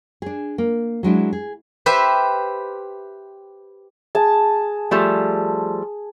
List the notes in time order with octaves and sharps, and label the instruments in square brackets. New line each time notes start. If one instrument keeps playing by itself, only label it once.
[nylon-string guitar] D4 G#4
A#3
F#3 G#3 D4 E4
G#4
[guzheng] G4 B4 C5 E5
[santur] G#4 A5
[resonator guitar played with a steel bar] F3 G3 A3